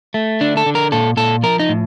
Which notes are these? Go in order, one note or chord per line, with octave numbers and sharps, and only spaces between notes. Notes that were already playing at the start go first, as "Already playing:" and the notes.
A3
D3 D4
A4
D3
A#4
A#2 A4
A#2 A4
F3 A#4
D#4
A2